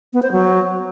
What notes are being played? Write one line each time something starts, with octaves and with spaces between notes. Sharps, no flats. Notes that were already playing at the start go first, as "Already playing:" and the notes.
B3
C5
F#3